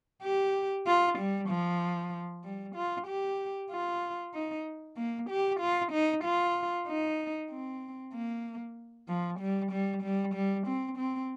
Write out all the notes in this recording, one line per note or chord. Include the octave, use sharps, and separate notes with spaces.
G4
F4
G3
F3
G3
F4
G4
F4
D#4
A#3
G4
F4
D#4
F4
D#4
C4
A#3
F3
G3
G3
G3
G3
C4
C4